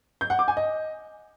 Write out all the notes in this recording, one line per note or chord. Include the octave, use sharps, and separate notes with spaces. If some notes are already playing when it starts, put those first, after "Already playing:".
G6
F#5
D6
G#5
D#5